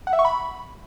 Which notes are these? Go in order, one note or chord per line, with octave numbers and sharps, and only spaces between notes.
F#5
E5
C#6
B5